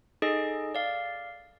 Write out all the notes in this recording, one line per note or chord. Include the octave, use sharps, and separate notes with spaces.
D#4 G#4 A4 D#5
D5 F5